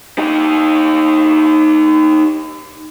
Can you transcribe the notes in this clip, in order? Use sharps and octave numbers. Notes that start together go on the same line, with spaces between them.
D#4 G4